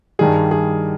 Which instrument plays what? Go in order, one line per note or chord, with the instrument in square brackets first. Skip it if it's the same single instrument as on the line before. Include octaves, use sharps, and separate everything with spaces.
[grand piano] G2 D#3 G3 G#4
G#4